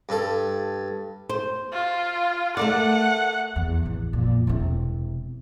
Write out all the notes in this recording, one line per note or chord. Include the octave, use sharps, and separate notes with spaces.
G2 A4
C5
F4
A3 A#4 D5 F#5
E2
A1 E2
F2 A#2
E1 C3